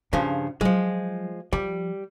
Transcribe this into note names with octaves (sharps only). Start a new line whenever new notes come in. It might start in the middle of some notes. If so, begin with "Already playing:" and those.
G2 C#3 F3 D4
F3 F#3 G#3
F3 G3